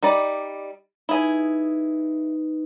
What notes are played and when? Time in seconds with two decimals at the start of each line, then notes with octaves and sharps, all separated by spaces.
0.02 G3 D#4 D5
1.09 D#4 E4 G#4 B4